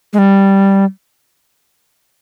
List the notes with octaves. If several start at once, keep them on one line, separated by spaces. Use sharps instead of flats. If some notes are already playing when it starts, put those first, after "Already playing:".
G#3
G3